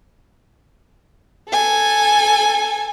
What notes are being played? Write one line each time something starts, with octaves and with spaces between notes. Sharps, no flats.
A4 G#5